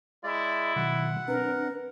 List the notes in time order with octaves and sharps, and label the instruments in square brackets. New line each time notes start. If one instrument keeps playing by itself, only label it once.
[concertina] G#3 D5 [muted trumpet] E4
[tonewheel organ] B2 D#3 F#3 [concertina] F#5
[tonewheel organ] C4 D4 [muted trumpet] A#4 [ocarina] B4